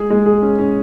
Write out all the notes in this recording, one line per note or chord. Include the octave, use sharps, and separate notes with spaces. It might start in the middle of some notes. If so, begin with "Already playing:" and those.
Already playing: G#3 G#4
G#3
G#4
C#4
C#4